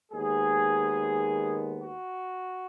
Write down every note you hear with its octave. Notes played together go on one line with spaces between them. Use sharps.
D#2 D#3 G#3 B3 G#4
F#4